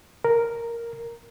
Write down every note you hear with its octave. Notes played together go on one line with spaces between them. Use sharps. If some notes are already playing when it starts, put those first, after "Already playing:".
A#4